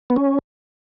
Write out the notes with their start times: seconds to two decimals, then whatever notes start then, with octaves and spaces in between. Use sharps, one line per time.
0.10 B3
0.16 C#4